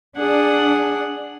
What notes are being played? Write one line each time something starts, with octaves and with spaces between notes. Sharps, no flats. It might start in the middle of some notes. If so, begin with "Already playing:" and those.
D4 G#4 F#5